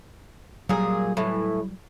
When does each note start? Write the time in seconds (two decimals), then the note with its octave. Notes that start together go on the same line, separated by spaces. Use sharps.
0.69 A#2 F#3 G3 G#4
1.17 A2 E3